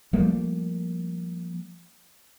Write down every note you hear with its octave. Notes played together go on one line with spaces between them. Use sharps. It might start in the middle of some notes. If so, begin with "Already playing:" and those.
F3 G3 A3 A#3